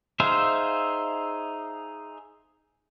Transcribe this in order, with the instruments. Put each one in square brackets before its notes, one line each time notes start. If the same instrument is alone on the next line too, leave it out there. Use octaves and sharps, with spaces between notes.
[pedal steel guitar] D#4 G#4 C5 E5 F5